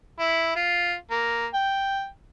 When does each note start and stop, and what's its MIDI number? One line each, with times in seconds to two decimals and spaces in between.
0.19 0.52 64
0.56 0.94 65
1.11 1.46 58
1.54 2.07 79